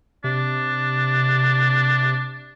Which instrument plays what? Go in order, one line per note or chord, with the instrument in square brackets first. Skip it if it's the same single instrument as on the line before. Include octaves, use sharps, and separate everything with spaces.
[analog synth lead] C3 [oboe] D4